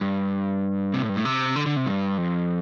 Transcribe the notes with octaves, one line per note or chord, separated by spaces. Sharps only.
G2
C3
A2
G2
A2
C3
D3
D3
C3
G2
F2